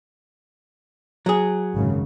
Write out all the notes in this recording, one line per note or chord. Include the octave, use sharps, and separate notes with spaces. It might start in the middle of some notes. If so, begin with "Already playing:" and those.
F#3 G#4
G#1 F#2 C#3